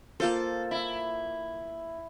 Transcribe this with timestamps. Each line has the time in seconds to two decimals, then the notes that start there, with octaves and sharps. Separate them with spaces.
0.20 A#3 F4 A4 C5
0.71 E4